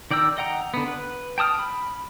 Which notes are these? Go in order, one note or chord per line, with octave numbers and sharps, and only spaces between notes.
D#3 D5 G5 A#5 E6
D#5 F#5 G5 A#5
D3 B3
B4
G5 A5 D#6 F6
B5